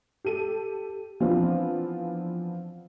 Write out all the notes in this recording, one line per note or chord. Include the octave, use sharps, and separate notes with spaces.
G4 A4 D#7
E3 F3 B3 C4 D4 F4